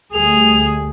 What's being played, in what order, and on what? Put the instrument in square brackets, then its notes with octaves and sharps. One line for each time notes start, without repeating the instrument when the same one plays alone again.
[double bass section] D2 G3 A3 [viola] G#4 [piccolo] F7